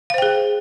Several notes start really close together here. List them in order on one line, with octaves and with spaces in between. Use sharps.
F5 C5 G5 G#4